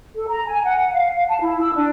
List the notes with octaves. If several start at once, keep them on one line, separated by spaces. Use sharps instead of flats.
A4
A#5
G#5
F#5
F5
F5
A5
E4
E6
D4